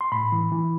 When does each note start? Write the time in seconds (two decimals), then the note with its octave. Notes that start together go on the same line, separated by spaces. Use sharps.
0.01 C6
0.12 A2 B5
0.32 E3
0.52 E3